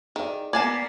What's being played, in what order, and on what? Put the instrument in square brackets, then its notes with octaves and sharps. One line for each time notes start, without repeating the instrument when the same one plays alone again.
[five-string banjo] D#3 [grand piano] G#4 D5
[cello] A#3 B3 [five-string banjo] D5 G#5 A5 [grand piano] G#6